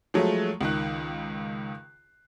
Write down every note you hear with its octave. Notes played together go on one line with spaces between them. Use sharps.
F3 F#3 G#3 A3
C#2 D#3 F#6